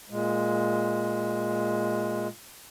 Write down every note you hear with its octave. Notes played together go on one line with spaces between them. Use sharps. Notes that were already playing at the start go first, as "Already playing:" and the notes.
A#2 G#3